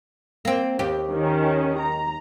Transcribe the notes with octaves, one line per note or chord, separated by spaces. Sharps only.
A#3 C4
D#2 G4
D#3 C#4
A#5